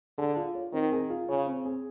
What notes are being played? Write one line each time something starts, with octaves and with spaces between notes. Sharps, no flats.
D3 G#4
F4
C#5
D#3 C4
G#4
F4
C#3 C#5
C4
G#4